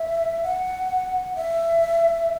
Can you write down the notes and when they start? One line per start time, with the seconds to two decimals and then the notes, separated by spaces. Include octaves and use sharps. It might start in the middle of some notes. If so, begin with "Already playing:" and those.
Already playing: E5
0.43 F#5
1.36 E5